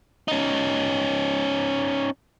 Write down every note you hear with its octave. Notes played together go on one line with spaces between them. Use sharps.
C#4 D#4